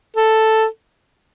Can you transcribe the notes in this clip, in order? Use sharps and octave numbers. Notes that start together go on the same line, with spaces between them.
A4